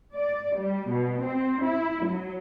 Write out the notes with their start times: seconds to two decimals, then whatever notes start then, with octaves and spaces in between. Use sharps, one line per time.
0.16 D5
0.59 G3
0.91 B2
1.23 C4
1.64 E4
2.08 F#3